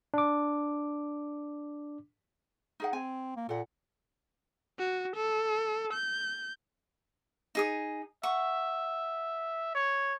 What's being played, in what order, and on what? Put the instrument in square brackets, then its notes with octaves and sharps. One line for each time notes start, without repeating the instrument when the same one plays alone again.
[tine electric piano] D4 D6
[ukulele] D#4 G#4 F#5
[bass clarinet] C4 [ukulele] G#5
[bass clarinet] A#3
[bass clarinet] A#2 [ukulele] A4 F#5
[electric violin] F#4
A4
G6
[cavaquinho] D#4 G#4 D#6
[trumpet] E5 [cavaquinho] F#5 C#6
[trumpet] C#5